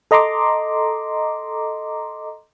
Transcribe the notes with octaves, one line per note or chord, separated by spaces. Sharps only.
A4 D#5 A#5 C6 D6